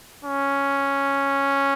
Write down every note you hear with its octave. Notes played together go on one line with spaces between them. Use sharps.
C#4